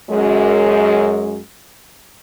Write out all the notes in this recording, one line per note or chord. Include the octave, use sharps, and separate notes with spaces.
F#2 G#3